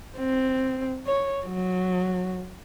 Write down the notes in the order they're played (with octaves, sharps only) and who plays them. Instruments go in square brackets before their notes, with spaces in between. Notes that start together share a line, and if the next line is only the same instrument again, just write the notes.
[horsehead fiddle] C4
C#5
F#3